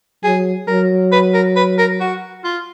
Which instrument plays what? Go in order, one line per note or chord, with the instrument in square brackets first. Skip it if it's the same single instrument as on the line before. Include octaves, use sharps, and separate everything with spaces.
[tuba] F#3 [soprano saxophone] G#4
[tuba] F#3 [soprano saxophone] A#4
[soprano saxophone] B4
A#4
B4
A#4
F#4
F4